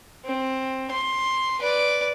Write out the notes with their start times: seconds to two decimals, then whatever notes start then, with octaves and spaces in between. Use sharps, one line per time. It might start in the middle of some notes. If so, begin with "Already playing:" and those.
0.25 C4
0.91 C6
1.59 B4 D5